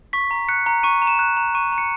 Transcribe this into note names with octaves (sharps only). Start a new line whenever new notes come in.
C#6 B6
A#5
F#6 C#7
A#5
C#6 D#7
A#5
E7
F#6
A#5
C#6 D#7
A#5
C#7